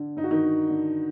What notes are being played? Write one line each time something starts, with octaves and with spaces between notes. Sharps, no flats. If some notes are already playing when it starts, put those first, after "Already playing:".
Already playing: D3
G2 D#4
F#4
D#3 D#4
D3
D3